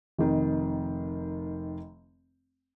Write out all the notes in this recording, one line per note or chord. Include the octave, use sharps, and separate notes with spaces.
F1 D#3 D#5